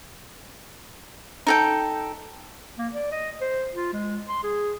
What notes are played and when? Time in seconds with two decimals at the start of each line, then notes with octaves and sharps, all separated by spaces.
1.47 D#4 A4 G5
2.78 A#3
2.94 D5
3.12 D#5
3.41 C5
3.74 F4
3.93 G#3
4.29 C6
4.44 G#4